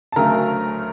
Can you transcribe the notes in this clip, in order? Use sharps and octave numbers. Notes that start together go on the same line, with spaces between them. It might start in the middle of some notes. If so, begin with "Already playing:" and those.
A5
D2 C#3 F#3 A3 A#4 A#5